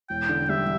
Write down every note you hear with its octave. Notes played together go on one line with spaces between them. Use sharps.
E1 G5
D3
G3 E5